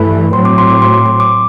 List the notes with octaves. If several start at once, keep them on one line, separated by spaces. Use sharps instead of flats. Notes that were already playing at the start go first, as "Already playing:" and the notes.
Already playing: G2 E3 A3 B5
A2 F#3 C4 C6
D6
C6
D6
C6
D6
C6
D6